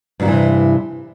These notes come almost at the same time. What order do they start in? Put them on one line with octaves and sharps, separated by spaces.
G2 F#3 D#3 E3 C3